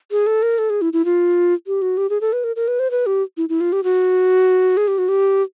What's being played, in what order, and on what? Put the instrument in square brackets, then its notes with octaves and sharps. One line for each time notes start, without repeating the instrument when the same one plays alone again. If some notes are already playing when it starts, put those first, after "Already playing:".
[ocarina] G#4
A4
A#4
A4
G#4
E4
E4
F4
G4
F#4
G4
G#4
A4
B4
A#4
A#4
B4
C5
B4
G4
E4
E4
F4
G4
F#4
G#4
G4
F#4
G4